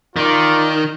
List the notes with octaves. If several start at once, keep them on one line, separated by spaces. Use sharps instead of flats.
D#3 F4 A#4 D5